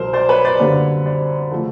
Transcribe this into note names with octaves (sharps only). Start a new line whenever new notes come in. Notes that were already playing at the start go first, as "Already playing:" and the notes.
Already playing: C2 B2 F#3 A#4 C5
C5 D5
B4 C#5
C5 D5
F#2 D3 G3 A#3 B4 C#5
C5 D5
C#3 F3 A3